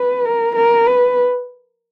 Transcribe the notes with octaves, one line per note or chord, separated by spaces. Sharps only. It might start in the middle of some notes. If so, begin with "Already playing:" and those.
Already playing: B4
A#4
A#4
B4